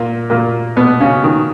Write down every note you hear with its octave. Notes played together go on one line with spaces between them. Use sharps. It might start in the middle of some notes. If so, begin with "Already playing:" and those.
Already playing: A#2 A#3
A#2 A#3
B2 B3
C#3 C#4
D#3